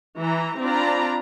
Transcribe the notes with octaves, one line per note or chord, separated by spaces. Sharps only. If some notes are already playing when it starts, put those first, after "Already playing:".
E3 A#5
C4 D4 F4 D5 A#5 B5